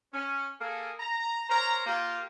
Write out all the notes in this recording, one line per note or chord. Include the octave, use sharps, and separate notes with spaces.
C#4
A#3 G#4 A4
A#5
A#4 C5 C#5 A#5
A#3 F4 G4